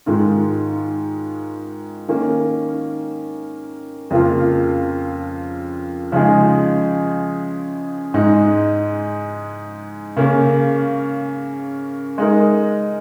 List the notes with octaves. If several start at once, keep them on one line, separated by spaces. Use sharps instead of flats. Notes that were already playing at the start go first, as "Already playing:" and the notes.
G#2 D#3 G#3 F4
D#3 A#3 C#4
F2 C#3 F3 A#3 F4
C#3 F3 G#3 D#4 G#4
G#2 G#3 D#4
C#3 A#3 C#4
G#3 D#4 A#4